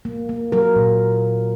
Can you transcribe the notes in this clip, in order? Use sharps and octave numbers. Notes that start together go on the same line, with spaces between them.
A#3
A#3
F#3 A#4
A#2